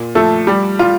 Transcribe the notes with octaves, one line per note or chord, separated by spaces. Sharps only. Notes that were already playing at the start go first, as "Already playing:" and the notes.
Already playing: A#2
F3 A3 A4
G3 G4
G3 F4